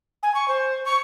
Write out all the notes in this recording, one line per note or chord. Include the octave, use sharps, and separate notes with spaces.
G#5
C#6
C5
C#6